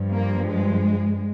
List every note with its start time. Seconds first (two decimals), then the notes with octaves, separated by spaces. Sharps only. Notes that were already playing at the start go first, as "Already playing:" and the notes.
Already playing: G2 F3
0.12 A#3
0.47 G#3